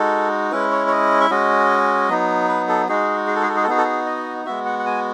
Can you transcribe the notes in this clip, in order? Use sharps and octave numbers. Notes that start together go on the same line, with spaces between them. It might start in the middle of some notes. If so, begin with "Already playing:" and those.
Already playing: G#3 D#4 F#4 A4
G#3 C#4 E4 B4
C#5
C#5
D#5
E5
G#3 C#4 F#4 D#5
F#3 B3 D#4
B4
A4
G#3 D#4 F#4 G#4
G#4
A4
G#4
A4
G#4
A4
B3 D#4 F#4 G#4
A4
G#4
D#5
G#3 B3 F#4 E5
F#5
F#5
G#5